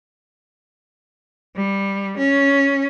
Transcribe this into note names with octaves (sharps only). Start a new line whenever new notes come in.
G3
C#4